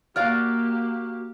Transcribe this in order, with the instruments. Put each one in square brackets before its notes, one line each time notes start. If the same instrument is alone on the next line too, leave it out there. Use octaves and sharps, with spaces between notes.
[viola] A#3 G4 [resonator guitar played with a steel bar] F#4 D5 F5 [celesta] F6